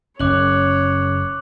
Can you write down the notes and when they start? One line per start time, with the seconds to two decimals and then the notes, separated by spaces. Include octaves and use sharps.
0.20 F#1 C#4 C#5 D6 F#6 F#7